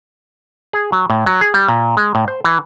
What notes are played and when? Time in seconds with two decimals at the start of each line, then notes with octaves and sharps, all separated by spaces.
0.73 G#4
0.92 F#3
1.10 A2
1.26 F#3
1.41 G#4
1.54 G3
1.68 A#2
1.97 G#3
2.15 A2
2.28 C5
2.44 E3